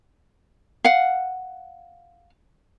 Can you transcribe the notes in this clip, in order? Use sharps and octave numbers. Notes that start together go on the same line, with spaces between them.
F5 F#5